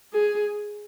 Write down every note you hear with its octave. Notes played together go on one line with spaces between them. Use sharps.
G#4